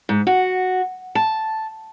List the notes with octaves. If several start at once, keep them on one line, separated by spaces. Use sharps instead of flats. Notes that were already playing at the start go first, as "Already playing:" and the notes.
G#2
F#4
A5